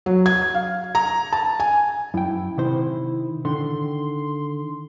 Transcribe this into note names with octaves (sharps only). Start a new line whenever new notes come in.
F#3
G#6
F5
A#5
A5
G#5
F#2 E4 G5
C3 D#3 C5
D3 D#3 C6